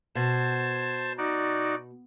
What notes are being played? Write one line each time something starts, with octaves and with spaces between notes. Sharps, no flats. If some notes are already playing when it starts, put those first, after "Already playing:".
B2 C5 A5 G#6
D#4 F#4 D5